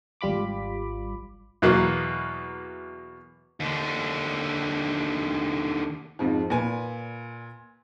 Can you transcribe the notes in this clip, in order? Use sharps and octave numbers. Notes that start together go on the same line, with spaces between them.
G#1 G3 F4 B5 D6
E2 B2 F#3 A#3
D#2 D3
F2 G#2 F3
A#2 B4 G#5